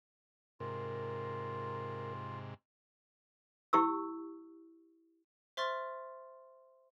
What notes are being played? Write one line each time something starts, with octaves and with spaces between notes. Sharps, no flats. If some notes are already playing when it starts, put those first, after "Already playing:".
G#2 C3 F4 A#4
E4 G4 C#6 E6
C5 E5 C6 C#6 F6 A6